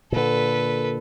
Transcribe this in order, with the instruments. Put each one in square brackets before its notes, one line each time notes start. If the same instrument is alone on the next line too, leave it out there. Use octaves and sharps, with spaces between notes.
[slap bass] A#2 D3 [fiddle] A4 B4